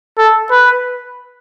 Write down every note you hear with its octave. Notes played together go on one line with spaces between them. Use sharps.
A4
B4